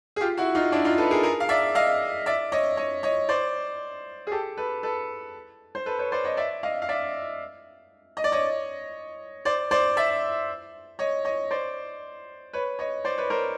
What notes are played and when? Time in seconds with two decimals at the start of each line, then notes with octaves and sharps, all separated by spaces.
0.16 G#4
0.21 F4 G4
0.37 E4 F#4
0.55 D#4 F4
0.72 D4 E4
0.85 D#4 F4
0.98 A4 B4
1.11 G#4 A#4
1.23 G#4 A#4
1.40 F5
1.49 D5 E5
1.75 D#5 F5
2.26 D5 E5
2.52 C#5 D#5
2.77 C#5 D#5
3.03 C#5 D#5
3.29 C5 D5
4.27 G#4
4.32 G4 A4
4.57 A4 B4
4.83 A4 B4
5.75 C5
5.86 A4 B4
5.99 B4 C#5
6.12 C5 D5
6.24 C#5 D#5
6.37 D5 E5
6.63 D#5 F5
6.82 F5
6.89 D5 E5
8.17 D#5
8.24 D5
8.32 C#5 D#5
9.45 C5 D5
9.71 C5 D5
9.97 D5 E5
10.99 C#5 D#5
11.25 C#5 D#5
11.51 C5 D5
12.53 B4 C#5
12.79 C#5 D#5
13.05 C5 D5
13.18 B4 C#5
13.30 A#4 C5